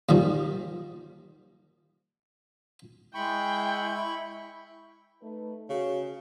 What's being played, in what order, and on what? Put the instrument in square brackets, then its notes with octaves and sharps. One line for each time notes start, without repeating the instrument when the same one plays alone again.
[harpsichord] A#2 D#3 F3 G3
[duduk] G#3 [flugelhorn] E4 [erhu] G5 [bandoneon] B5 C#6
[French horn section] A3 D#4 B4
[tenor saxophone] C#3 [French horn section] F#4